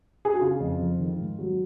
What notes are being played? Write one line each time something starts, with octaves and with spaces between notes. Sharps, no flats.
G#4
F#4
C#3 F4
F2
F3
D#3
G#2
F#3